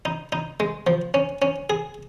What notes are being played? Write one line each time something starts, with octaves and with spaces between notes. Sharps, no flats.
D#4
D#4
G#3
F3
C#4
C#4
G#4